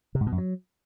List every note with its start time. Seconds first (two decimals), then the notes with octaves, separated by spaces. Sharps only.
0.15 C3
0.21 G#2
0.26 B2
0.32 F#2
0.38 F#3